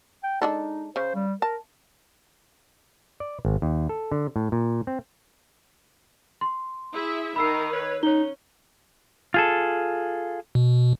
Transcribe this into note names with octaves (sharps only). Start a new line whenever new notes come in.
G5
G#3 D4 D#4 A4
C#3 C5
G3
A#4 A5
D5
G#1
D#2
A4
D3
A2
A#2
C4
C6
E4 G#4 E5
D#3 A#4 B5 E6 C7
B4 C#5
C#4 D#4 C#5 G7
F4 G#4 A4
B2